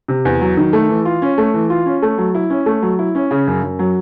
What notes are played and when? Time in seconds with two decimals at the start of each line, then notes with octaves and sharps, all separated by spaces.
0.08 C3
0.25 E2
0.41 F#3
0.57 D#3
0.73 A3
0.89 E3
1.05 F4
1.22 C#4
1.38 A3
1.54 E3
1.70 F4
1.86 C#4
2.02 A3
2.18 F#3
2.35 E4
2.50 C#4
2.66 A3
2.82 F#3
2.99 E4
3.15 C#4
3.31 C#3
3.47 F#2
3.63 F#2
3.79 F#3